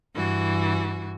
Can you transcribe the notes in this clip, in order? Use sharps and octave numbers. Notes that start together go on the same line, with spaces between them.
G2 E3 F#4